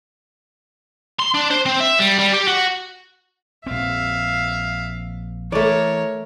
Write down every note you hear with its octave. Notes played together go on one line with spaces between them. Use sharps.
C6
D4
C5
C4
E5
G3
G3
G4
F#4
A#1 C4 E5 F5
E3 A3 A#4 C#5 D5